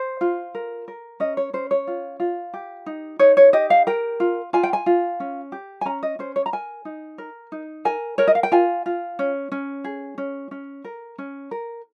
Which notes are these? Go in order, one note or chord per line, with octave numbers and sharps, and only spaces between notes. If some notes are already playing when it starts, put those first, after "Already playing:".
Already playing: C5
F4
A#4
A#4
C#4 D#5
C#5
C#4 C5
C#5
F4
F4
G4
D#4
D#4 C#5
C#5
G4 D#5
F5
A#4 G5
F4
F4 G#5
G5
G#5
F4
C#4
G4
G#5
C#4 A#5
D#5
C#4 C5
C#5
A#5
A#4 G#5
D#4
A#4
D#4
A#4 G#5
A#4 C#5
D#5
F5
G5
F4 G#5
F4
C#4
C#4
G#4
C#4
C#4
A#4
C#4
A#4